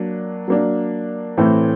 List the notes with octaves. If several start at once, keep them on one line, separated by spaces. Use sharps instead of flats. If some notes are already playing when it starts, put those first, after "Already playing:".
Already playing: F#3 A#3 D4
F#3 A#3 D4
A2 E3 A3 C4